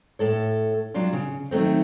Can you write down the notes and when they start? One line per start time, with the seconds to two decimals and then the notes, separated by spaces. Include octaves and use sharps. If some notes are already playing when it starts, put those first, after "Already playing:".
0.19 A2 A4 C#5
0.94 F#3 G3 D4 F4
1.13 C#3
1.51 D#3 F#3 A3 C4